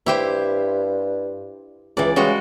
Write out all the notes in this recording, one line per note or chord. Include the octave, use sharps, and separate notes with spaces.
G2 E4 G4 C5
C#2 E3 D5
C#3 G3 G#3 F#4